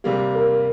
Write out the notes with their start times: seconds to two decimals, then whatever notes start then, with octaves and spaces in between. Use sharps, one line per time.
0.04 C3 G3 A#3 G4
0.35 A#4